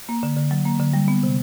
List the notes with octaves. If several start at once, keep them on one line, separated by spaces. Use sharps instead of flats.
A#3
D3
D3
F#3
A#3
D3
G3
B3
C3